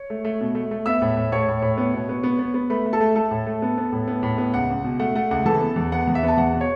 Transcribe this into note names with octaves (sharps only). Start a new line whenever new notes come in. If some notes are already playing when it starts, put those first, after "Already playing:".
Already playing: C#5
A3
A3
B2
A3
A3
B3 E5 E6
A2
A2
A2 C#5 C#6
A2
A2
B3
B2
B3
B3
B3
B3
A3 B4 B5
A3
A4 A5
A3
A3 A4 A5
A2
A3
B3
B3
A2
B3
A2
B3
C#2 F#5
C#2
B2
A3 F#5
A3 F#5
C#2 F#5
E3 A4 A5
B3
E2
B3 F#5
E2
E5
B3
A5
E2 F#5
B2
C#5